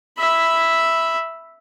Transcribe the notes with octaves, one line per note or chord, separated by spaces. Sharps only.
E5 B5